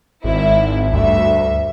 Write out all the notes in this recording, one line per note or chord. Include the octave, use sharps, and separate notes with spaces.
G#1 E4
D2 G2 E5